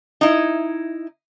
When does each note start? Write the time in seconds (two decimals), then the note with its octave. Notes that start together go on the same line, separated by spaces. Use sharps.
0.21 D#4 E4